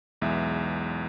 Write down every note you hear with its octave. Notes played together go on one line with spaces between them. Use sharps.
B1 E2 G#3 E5